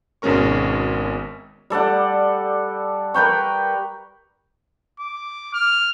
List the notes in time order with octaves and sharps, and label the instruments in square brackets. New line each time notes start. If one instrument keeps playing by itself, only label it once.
[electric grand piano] G#1 B2 G#3 C#4 A#4 C#6
[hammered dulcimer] G3 A4 D5 F#5
A#4 B4 G5 C#6
[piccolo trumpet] D6
F6